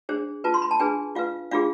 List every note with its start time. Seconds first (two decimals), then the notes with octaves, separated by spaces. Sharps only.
0.09 D4 G#4 C5
0.44 F4 B4 A5
0.54 C6
0.62 B5
0.71 A5
0.80 D4 G#4 B4 G#5
1.15 F4 B4 F5
1.51 D4 F4 G#4 F5